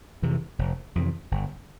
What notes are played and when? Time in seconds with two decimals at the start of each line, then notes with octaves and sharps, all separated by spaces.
0.22 F2 C3 E3
0.59 F1
0.95 F2 C3 E3
1.31 G1